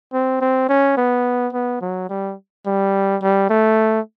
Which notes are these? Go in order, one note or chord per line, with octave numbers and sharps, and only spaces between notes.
C4
C4
C#4
B3
B3
F#3
G3
G3
G3
A3